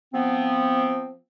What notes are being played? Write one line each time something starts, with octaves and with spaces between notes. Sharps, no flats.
F3 B3 C4